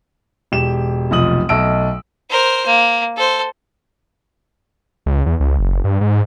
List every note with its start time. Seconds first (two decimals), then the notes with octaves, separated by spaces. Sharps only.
0.52 E1 G4 E7
1.11 F1 B1 F3 D#6 F#7
1.49 B1 A3 D#5 A5 E6 D7
2.30 A#4 C5
2.66 A#3
3.16 A4 C5
5.06 C#2
5.26 E2
5.40 C#2
5.59 F#1
5.84 G2
6.01 G#2